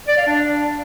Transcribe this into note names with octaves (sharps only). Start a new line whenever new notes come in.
D5
F5
D4